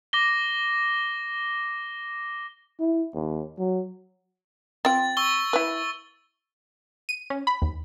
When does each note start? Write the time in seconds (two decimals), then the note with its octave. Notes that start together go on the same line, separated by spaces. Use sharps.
0.13 D6 A#6 G7
2.80 E4
3.15 D#2
3.58 F#3
4.85 C4 F4 G5 A6
5.17 C#6 E6 G7
5.53 E4 B4
7.09 D#7
7.30 C#4
7.47 B5
7.62 D#2